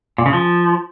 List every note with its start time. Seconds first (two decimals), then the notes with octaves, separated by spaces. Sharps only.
0.18 A#2
0.26 C#3
0.33 F3